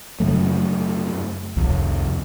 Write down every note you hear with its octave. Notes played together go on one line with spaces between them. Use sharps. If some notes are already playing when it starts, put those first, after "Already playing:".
F#2 C#3 F#3 A3
C2 F2